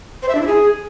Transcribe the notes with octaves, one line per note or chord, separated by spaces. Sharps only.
C5
E5
D4
E4
G#4